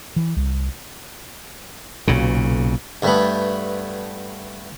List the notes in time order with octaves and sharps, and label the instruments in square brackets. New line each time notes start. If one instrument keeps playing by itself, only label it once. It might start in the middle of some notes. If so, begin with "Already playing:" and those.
[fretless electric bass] E3
C2
[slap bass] B1 A#2 C#3
[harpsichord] G2 A3 B3